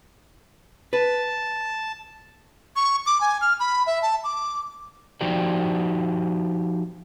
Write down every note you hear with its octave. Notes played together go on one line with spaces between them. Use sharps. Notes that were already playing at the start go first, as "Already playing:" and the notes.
B4 A5
C#6
D6
G#5
F6
B5
E5
A5
D6
F3 D#4 F#4 G4 C5 D5